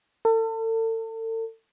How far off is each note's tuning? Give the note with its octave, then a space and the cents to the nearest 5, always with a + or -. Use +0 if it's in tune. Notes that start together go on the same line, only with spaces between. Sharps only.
A4 +35